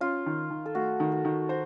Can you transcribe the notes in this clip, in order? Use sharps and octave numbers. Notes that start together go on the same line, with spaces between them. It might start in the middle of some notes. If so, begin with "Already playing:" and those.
C#4 F4
D#3
D#3
A4
A3 F#4
D#3
A4
D#3
F#4 C5